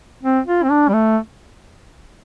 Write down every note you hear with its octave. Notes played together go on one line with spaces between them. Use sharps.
C4
F4
C4
D4
G3
A3